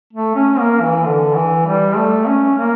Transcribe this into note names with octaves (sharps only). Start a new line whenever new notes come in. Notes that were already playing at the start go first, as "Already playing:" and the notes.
A3
C#4
A#3
E3
D3
E3
G3
A3
C#4
A#3